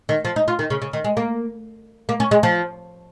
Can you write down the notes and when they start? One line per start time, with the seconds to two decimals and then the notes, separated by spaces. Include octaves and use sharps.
0.09 D#3
0.25 F3
0.36 D#4
0.48 F4
0.59 D#3
0.70 C#3
0.82 C#3
0.93 D#3
1.04 G#3
1.17 A#3
2.09 A#3
2.20 C#4
2.31 G#3
2.43 F3